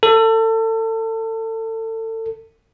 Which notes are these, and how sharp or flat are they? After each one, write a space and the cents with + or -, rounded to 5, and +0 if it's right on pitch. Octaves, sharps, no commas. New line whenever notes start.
A4 +30